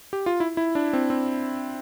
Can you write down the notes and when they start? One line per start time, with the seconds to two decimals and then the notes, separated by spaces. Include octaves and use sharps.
0.13 G4
0.26 F4
0.40 E4
0.57 E4
0.75 D4
0.93 C4
1.10 C4